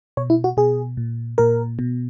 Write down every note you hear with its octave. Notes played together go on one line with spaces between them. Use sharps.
B2 C#5
E4
F#4
B2 G#4
A#2
A#2 A#4
B2